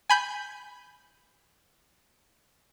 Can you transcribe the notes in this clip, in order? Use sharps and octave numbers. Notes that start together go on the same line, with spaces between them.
G#5 B5 G6